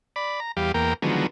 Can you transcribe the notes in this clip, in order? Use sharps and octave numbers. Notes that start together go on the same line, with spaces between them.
D5 B5
A#5
E2 G3 G4 F5
E2 A#3 A#4 G5
D3 D#3 F3 F#3 G#3 B3